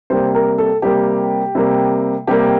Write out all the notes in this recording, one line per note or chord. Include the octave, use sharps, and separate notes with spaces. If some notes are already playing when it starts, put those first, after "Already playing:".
C3 G3 A#3 C5
A#4
A4
C3 G3 A#3 G4
C3 G3 A#3
C3 G3 A#3 G4